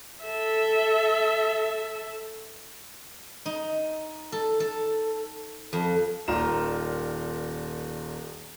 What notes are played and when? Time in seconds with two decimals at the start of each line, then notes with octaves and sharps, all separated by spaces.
0.24 A4 E5
3.46 D#4
4.32 A4
4.60 A4
5.73 F2
6.28 D#1 D#3 F4 A#5 E7